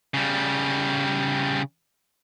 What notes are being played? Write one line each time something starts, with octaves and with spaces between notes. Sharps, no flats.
C#3 G3